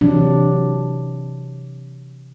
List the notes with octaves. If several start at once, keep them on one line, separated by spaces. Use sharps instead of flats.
C3 E3 F#3 D4